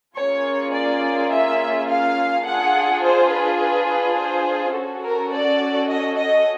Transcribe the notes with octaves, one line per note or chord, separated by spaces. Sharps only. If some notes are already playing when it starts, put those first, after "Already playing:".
A#3 C#4 F4 G#4 C#5
D5
E5
F5
D4 F4 G#4 F#5
C5
B4
B4
B4
C5
C#4 F#4 A4
A#4
D5
D#5
D#5